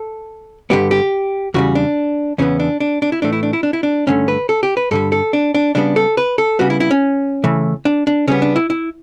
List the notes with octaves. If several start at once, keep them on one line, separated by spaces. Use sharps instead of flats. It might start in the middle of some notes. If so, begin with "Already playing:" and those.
Already playing: A4
G2 D3 G3 B3 G4
G4
E2 C#3 G3 F#4
D4
E2 C#3 E3 B3 C#4
D4
D4
D4
E4
A2 E3 A3 D4
E4
D4
E4
D4
E4
D4
G2 D3 A3 C#4
B4
A4
G4
B4
G2 D3 G3 A4
A4
D4
D4
C#3 G3 B3 D4
A4
B4
A4
C#3 G3 B3 F#4
E4
E4
C#4
C#3 E3 A3
D4
D4
C#3 G3 B3 C#4
D4
E4
E4